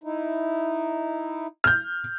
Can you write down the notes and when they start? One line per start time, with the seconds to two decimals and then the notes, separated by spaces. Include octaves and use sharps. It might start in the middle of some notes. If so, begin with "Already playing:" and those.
0.04 D#4 E4
1.64 F6 G6